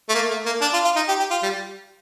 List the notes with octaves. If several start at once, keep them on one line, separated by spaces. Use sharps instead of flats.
A3
A#3
A3
A#3
D4
F4
F4
D#4
G4
G4
F4
G3